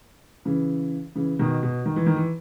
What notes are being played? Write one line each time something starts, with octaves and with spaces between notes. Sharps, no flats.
C#3 E3
C#3 E3
B2 D#3
B2
D#3
E3
D#3
E3